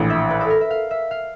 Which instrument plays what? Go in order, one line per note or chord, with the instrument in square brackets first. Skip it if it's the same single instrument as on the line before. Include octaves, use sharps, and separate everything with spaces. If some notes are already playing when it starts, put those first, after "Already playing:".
Already playing: [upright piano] A#1 A2 E3
[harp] E5
B4
A4
A#4
E5
F5
E5
F5